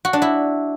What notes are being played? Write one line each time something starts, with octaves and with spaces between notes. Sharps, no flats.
F#4
D4
E4